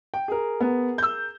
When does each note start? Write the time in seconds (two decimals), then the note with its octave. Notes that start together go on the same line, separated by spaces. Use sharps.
0.14 G5
0.28 G#4 A#4
0.60 B3
0.98 E6 G6